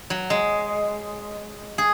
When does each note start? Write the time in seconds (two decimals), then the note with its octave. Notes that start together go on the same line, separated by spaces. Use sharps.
0.10 F#3
0.30 G#3
1.78 G#4